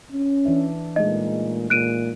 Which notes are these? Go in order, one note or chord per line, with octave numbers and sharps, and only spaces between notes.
C#4
E3 D4 E5
A#2 G#3 A3 D#4 D#5
A#2 F#6 D7 D#7